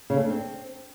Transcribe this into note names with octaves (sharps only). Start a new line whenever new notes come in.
C#3
A3
D4
C4